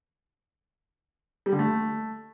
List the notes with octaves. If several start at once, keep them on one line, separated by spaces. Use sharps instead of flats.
G3
D3
A3